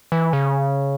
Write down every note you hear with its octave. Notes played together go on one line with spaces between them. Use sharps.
E3
C#3